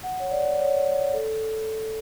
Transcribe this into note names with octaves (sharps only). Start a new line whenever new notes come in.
F#5
C#5
D5
C#5
A4